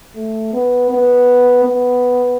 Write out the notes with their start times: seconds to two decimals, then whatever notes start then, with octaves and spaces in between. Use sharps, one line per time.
0.16 A3
0.53 B3
0.91 B3
1.65 B3